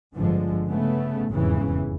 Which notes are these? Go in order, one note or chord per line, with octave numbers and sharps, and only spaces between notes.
G1 D3 F3 G#3
C#3 A3 B3
F1 E2 G#2 C#3 E3